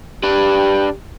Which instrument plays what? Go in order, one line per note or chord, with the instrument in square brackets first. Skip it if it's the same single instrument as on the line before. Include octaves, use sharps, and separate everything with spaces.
[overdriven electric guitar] D4 B4 [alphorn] G4